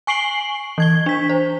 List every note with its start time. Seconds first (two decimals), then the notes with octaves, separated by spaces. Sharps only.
0.07 G#5 C#6 C7 D7 F#7 G7
0.78 E3 G#6 G7
1.06 D4 B6
1.29 C5